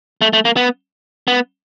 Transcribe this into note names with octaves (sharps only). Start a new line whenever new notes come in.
A3
A3
A#3
B3
B3